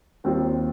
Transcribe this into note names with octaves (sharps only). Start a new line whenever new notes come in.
D#2 D#3 G3 C4 F4